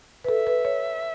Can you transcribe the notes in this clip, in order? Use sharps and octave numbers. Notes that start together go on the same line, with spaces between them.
B4
A4 E5
B4
C#5